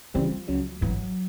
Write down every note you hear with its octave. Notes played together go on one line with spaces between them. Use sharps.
C#3 E3 F3 G3 C4
C#2 C#3 F#3
G#1 G2 E3 F#3